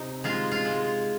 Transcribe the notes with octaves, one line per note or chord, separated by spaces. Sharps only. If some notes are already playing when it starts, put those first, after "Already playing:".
Already playing: C3 D#4
G#3 F4
F4
G#3